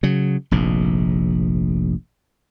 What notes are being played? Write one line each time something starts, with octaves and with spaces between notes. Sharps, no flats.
C#3 F#3
F1 A#1 G#2